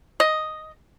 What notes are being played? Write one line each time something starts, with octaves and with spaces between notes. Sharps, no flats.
D#5